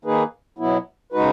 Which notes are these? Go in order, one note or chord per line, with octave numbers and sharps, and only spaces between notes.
D#3 A#3 D#4 G#4 B4
B2 F#3 B3 E4
C#3 G#3 D#4 F#4 B4